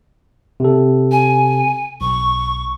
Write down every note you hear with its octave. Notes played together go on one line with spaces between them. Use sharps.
C3 A4
G#5
B1 C#6